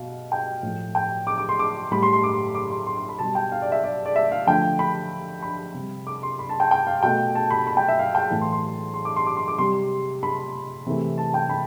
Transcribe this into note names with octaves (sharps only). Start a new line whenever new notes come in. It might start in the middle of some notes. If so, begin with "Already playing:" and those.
Already playing: B2 F5
G5
A2 F3 A3
G5
D6
D6
C6
D6
A2 G3 B5
C6
C6
D6
C6
D6
C6
C6
C6
B5
B2 G3 A5
G5
F5
D5
E5
D5
D5
E5
F5
D3 F3 A3 G5
B5
B5
C3 G3
D6
C6
B5
A5
G5
G5
F5
B2 A3 G5
A5
B5
B5
G5
E5
F5
G5
A2 E3 A3 A5
C6
C6
C6
D6
C6
D6
C6
D6
C3 G3 C6
B5
C3 E3 A3
A5
G5
B5